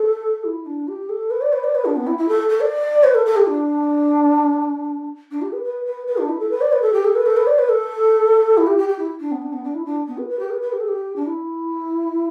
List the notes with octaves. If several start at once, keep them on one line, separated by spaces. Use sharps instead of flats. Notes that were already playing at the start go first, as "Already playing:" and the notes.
Already playing: A4
E4
D4
G4
A4
B4
D5
B4
D5
B4
D4
B3
E4
E4
A4
A4
D5
B4
A4
A4
G4
D4
D4
G4
B4
B4
B4
B4
D4
E4
A4
B4
D5
B4
A4
G4
A4
B4
A4
B4
D5
B4
A4
E4
G4
G4
G4
E4
D4
B3
D4
B3
D4
E4
D4
B3
B4
B4
G4
B4
B4
G4
A4
G4
D4
E4